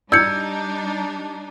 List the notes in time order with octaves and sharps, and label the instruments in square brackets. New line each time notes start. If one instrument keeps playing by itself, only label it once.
[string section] G3 D4 D#4 [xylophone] E6 G#6 C#7 [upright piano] G6